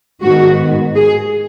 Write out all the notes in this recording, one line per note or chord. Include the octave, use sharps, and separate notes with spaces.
G#2 D#3 B3 F#4
G#4